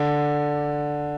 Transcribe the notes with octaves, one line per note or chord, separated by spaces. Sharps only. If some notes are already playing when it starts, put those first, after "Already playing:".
Already playing: D3